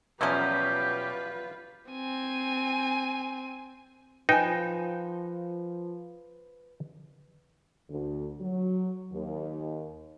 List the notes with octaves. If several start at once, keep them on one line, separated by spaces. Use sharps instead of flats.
E2 B2 F3 F#3 C#4 F4 G4 B4
C4 G#5
F3 D#4 B4 G5 G#5
D2
F#3
D#2